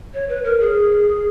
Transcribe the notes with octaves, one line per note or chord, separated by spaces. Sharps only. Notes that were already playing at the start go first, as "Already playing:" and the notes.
C#5
B4
A#4
G#4